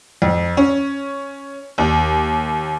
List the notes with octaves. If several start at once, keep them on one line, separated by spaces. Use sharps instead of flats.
F2
C#4
D#2